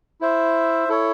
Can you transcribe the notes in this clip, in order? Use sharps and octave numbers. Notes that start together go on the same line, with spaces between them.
E4 C5 E5
E4 A4 C#5